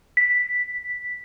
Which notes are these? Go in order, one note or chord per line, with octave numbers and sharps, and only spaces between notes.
B6